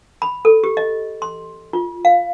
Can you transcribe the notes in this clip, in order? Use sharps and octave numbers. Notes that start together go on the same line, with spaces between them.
B5
A4
G4
D#5
C6
F4
F5